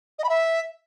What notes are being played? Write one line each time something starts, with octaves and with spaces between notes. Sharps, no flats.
D#5
B5
E5